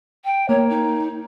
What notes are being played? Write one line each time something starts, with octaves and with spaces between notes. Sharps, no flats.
G5
A#3 C#5
D#4